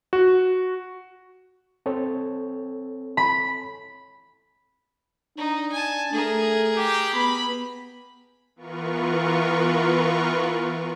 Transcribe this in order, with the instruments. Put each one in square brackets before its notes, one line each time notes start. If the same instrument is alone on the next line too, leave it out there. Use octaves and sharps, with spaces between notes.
[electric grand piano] F#4
[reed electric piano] C4 A4 C#5
[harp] B5
[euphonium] D4 [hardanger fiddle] D#4
[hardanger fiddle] G#5 A5
[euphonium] A3 [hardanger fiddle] G#4 A#4
[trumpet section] G4
[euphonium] B3 [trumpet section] B5
[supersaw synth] E3 B3 F4 A#4 B4 C#6